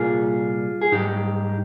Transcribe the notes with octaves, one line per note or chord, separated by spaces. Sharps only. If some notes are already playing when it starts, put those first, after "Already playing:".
Already playing: C2 A#2 G3 F4 G#4
G#4
G#2 G3 D#4 G4